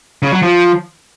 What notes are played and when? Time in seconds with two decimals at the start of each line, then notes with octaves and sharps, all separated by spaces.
0.22 C#3
0.32 F#3
0.42 F3